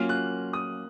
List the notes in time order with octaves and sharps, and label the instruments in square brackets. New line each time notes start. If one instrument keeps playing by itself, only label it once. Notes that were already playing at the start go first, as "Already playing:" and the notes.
Already playing: [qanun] F#3 A#3 C#4 F4 [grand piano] F6
[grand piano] F#6
D#6